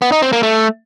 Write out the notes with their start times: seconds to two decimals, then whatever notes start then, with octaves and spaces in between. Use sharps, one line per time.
0.02 B3
0.12 D#4
0.22 C4
0.33 A#3
0.43 A3